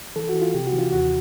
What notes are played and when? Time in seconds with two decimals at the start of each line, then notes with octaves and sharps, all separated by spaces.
0.16 E3 A4
0.29 F#4
0.34 E3
0.42 F4
0.54 C3 G4
0.67 F#4
0.73 E3
0.79 F4
0.93 D#2 F#4